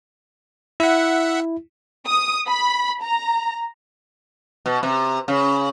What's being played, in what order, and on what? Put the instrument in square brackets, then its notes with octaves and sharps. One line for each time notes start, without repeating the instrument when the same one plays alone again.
[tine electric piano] E4 [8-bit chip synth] E5 F#5
[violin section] D#6
B5
A#5
[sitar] B2
C3
C#3